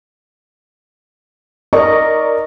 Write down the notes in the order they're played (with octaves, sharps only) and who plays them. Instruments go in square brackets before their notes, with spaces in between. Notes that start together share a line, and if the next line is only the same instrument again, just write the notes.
[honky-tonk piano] A#4 D5 C#6 [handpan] D#5